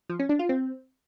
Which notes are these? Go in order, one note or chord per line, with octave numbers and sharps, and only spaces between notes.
F3
C#4
D4
F4
C4